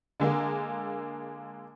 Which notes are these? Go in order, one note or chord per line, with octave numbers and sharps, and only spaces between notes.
D3 G#3 A#3